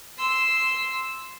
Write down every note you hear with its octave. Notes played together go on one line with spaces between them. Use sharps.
C6 E6